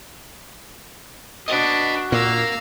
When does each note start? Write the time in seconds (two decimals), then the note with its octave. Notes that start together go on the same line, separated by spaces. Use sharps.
1.48 D4 F#4 B4 D#5
2.12 A#2 A#3 A#4 F5 E6